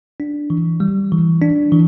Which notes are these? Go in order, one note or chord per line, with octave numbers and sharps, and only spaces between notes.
D4
E3
G3
E3
D4
E3